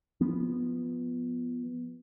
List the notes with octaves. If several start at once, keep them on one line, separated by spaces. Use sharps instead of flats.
F3 B3